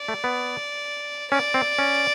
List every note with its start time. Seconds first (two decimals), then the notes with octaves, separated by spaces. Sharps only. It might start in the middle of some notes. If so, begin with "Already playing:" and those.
Already playing: D5
0.08 A3
0.24 B3
1.31 C#4 D5
1.54 C4
1.79 C#4